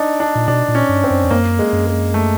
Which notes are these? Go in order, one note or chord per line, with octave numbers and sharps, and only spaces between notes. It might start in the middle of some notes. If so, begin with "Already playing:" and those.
Already playing: D4 D#4
D4
A#2
B2 D4
A#2
C#4
G2
C4
F#2
F2
F#2 A#3
G#3
F#2
G#3
A3